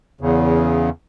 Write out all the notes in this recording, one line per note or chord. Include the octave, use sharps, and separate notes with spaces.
E2 C#3